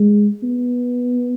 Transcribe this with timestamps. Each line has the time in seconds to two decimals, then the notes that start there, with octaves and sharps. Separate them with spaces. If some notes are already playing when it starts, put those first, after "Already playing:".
Already playing: G#3
0.43 B3